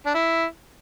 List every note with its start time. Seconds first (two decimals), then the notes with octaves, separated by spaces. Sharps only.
0.06 D4
0.14 E4